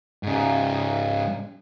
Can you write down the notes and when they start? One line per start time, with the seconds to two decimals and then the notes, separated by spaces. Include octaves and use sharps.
0.23 G#2 C#3